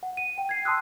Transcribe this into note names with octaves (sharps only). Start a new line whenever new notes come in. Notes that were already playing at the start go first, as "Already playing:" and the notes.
F#5
D#7
G5
G#6 C7
A5 C6 D#6 E6 F#6